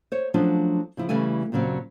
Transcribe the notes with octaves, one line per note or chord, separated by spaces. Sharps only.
C5 C#5
F3 F#3 A3 C#4 D4 F4
C#3 F3 E4
C#3 E3 G3 A3 E4 G#5
D#2 A#2 C#3 F#3 C4